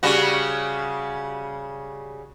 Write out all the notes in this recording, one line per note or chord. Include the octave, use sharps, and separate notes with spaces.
C#3 G3 F#4